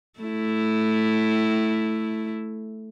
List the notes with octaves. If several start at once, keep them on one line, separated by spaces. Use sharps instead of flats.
A3 E4